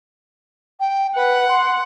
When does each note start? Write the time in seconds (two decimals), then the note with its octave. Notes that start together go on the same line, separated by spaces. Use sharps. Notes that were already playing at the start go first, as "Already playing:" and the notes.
0.80 G5
1.16 B4 F#5
1.49 C6